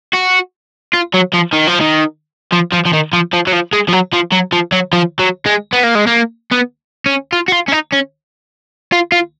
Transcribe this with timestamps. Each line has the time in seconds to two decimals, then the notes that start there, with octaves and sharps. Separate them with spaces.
0.13 F#4
0.93 F4
1.14 F#3
1.33 F3
1.53 D#3
1.67 F3
1.80 D#3
2.53 F3
2.73 F3
2.86 F3
2.94 D#3
3.13 F3
3.33 F3
3.47 F#3
3.53 F3
3.73 G#3
3.89 F3
3.93 F#3
4.13 F3
4.32 F#3
4.53 F3
4.72 F#3
4.93 F3
5.19 F#3
5.46 G#3
5.73 B3
5.83 A#3
5.95 G#3
6.07 A#3
6.52 B3
7.06 C#4
7.33 F4
7.48 F#4
7.52 F4
7.68 C#4
7.72 D#4
7.92 C#4
8.92 F4
9.12 F4